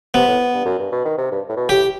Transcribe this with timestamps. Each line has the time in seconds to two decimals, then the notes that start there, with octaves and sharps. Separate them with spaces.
0.14 C3 B3
0.27 A2
0.54 G2
0.65 F#2
0.79 G2
0.92 B2
1.05 D#3
1.18 C3
1.31 G2
1.49 A2
1.56 B2
1.69 A2 G4